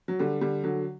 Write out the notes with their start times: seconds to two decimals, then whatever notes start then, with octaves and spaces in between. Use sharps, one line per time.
0.08 F#3
0.19 D3 G3
0.41 D3 G3
0.64 D3 F#3